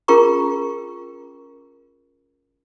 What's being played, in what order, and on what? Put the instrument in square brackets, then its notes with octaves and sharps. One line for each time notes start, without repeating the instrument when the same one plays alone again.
[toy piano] C#4 F4 G#4 A#4 A#5 C#6